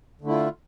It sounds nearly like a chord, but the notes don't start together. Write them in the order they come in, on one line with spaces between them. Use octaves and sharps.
D3 A3 E4 F4